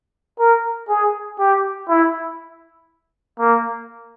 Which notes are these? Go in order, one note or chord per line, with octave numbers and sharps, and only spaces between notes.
A#4
G#4
G4
E4
A#3